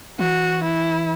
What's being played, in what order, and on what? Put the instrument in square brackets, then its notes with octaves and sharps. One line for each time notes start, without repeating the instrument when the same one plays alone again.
[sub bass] E3 [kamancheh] F#4
[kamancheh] E4